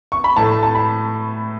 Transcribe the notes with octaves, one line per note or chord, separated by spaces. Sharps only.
C#6
B5
A2 A3 A5
A5
B5